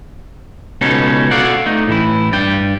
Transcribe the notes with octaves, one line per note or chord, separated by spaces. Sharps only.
C#2 B2 C#4 D#4 A4
F#4 A4 D5 F5 F#5
A3 D#4
A2 E3 E4
G2 D5 G5